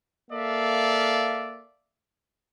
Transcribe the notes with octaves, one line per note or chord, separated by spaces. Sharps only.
A#3 A4 D5 E5 F5